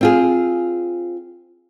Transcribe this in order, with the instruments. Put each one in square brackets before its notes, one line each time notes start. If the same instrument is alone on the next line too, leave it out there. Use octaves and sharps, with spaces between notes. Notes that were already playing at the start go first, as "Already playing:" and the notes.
[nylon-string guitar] C4 F4 G#4